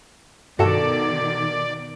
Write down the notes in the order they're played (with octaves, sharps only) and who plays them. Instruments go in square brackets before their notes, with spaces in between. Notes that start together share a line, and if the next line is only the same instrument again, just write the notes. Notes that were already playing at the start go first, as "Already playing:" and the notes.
[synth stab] G2 [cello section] B2 D#3 [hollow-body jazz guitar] F#4 A4 [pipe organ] D5